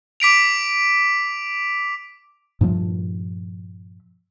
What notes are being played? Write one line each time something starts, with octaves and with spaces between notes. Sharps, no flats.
D6 B6 D7 F7
G2 A#2 F3 A3